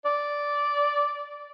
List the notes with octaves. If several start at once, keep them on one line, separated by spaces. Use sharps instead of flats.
D5